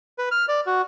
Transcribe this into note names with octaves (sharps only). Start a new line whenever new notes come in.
B4
F6
D5
F#4